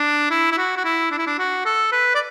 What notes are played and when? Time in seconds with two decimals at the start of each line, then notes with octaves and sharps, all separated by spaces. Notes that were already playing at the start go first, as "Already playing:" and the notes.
Already playing: D4
0.31 E4
0.52 E4
0.58 F#4
0.77 F#4
0.85 E4
1.11 D4
1.18 E4
1.27 D4
1.39 F#4
1.65 A4
1.92 B4
2.15 D5